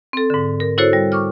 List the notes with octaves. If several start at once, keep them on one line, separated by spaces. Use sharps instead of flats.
C4 A4
G#2 D3
A#4
E4 F#4 A4 C5 C#5
G3
C#6 D6 F6